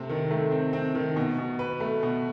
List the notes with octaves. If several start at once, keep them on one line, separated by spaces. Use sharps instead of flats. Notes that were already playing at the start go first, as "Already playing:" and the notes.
Already playing: C3 A3 C4
D#3
A3
C4
C4
D#3
B2
B2
B4
A3
B2